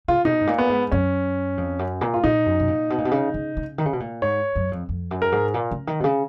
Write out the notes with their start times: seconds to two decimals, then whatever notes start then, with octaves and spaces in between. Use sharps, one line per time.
0.08 C#3 F4
0.25 B2 D#4
0.41 G#2
0.47 A#2
0.58 B3
0.69 G#2
0.92 F#2 C#4
1.57 F2
1.79 F#2
2.01 A#2
2.14 F4
2.24 A#2 D#4
2.46 F#2
2.60 B2
2.68 A#2
2.90 B2
2.98 A#2
3.05 B2
3.11 C#3
3.34 C#3
3.57 C#3
3.78 D#3
3.85 C#3
3.93 B2
4.00 A#2
4.22 G#2 C#5
4.56 F#2
4.71 F2
4.89 F2
5.11 F#2
5.22 A#4
5.32 G#2
5.54 A#2
5.71 C#3
5.87 D#3
6.00 B2
6.04 C#3